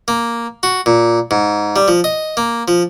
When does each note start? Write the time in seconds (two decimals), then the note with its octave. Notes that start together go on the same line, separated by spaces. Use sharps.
0.08 A#3
0.63 F#4
0.86 A#2
1.31 G#2
1.76 G3
1.88 F3
2.04 D#5
2.37 A#3
2.68 F3